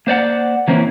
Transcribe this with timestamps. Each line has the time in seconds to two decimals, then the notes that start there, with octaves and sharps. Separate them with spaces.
0.07 A#3 C5 D5 F#5
0.68 E3 A#3 C4 C#4 E4